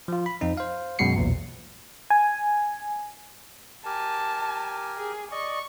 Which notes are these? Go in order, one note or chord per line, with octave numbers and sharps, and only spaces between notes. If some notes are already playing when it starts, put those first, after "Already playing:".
F3 F4
B5
F2 C4 D#4
C5 F5
F#2 B2 G#3 F#4 C7 C#7
B1 E2 A#2
G#5
G4 A#4 G#5 A5
G#4
D5 D#5 C#6